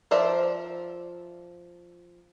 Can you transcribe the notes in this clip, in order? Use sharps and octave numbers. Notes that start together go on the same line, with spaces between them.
F3 A#4 C5 D5 E5